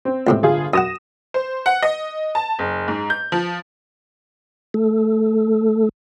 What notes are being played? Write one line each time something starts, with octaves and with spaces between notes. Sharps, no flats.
C4
C#2 A2 C3
G1 F4 G#4
F#2 F#5 D#6 A#6 E7
C5
F#5
D#5
A5
F#1
G#2
G6
F3
A3 A4